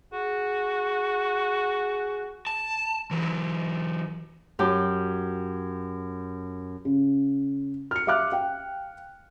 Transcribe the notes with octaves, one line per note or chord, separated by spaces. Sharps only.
F#4 G#4
A5
E3 F#3
F#2 G4
C#3
F6 C#7
E5 F5 D6 F6 F#6
F5 G5